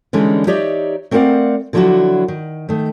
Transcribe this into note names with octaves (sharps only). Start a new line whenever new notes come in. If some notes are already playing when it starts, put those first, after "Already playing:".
D3 E3 G3 G#3 C#4 D#4
D#4 G4 C#5 D5 E5
A3 C4 A#4 D5 F5 F#5
D3 F3 F#3 D4 E4 F#4
D#3
D#3 A3